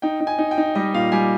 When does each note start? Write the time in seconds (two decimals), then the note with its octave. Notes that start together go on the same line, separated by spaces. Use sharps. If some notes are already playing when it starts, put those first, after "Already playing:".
0.02 D#4 G5
0.20 D#4
0.27 G#5
0.38 D#4
0.51 G5
0.58 D#4
0.75 G3 D#5
0.94 A#2 F5
1.12 G3 G#5